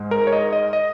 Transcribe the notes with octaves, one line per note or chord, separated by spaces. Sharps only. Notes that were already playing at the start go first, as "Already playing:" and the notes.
Already playing: G#2 G#3
A#4
C#5
D#5
D#5
D#5